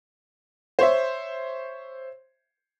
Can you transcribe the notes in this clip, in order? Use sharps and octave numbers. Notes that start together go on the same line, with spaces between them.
C5 C#5 E5